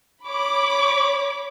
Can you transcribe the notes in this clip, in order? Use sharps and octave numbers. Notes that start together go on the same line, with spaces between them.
C#5 B5 D6